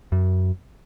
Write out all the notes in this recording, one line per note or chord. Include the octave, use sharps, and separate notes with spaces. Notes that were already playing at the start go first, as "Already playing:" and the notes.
F#2